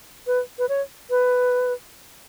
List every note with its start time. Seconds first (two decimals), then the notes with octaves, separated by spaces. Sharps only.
0.27 B4
0.59 B4
0.69 C#5
1.10 B4